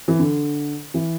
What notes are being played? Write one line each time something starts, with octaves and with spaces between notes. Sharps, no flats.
E3
D3
E3